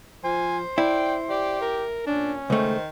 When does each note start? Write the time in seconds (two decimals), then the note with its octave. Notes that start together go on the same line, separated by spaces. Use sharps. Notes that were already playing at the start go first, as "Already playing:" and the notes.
0.24 F3 C5 G#5
0.78 E4 D5 G5
1.30 G4 D5
1.61 A#4
2.07 A#2 C#4 D4
2.50 C#2 D#3 A3 C5